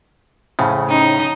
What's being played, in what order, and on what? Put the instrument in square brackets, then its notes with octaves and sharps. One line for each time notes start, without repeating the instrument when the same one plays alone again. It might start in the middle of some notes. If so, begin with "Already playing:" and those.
[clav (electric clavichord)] F2 A2 C#3
[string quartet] C#4 D#4